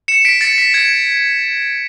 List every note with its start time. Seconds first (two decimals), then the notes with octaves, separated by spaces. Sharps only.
0.08 C#7 E7
0.25 B6 D7
0.41 A6 C#7
0.58 B6
0.74 G#6